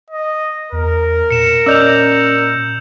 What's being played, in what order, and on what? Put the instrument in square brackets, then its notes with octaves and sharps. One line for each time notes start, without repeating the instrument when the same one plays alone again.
[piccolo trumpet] D#5
[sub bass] E2 [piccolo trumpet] A#4
[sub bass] A#2 [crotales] C#7 E7
[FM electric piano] C#4 D5 D#5 [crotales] E6 G6 F7